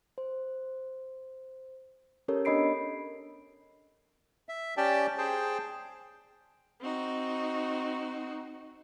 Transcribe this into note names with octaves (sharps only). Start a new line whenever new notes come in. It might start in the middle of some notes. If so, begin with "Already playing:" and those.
C5
C#4 G4 A4 A#4 C#5
B3 D4 D#5 B5 C7 D7
E5
C#4 G4 D5 G5 A5
G#4 C5 G5 A5
C4 D#4 F#4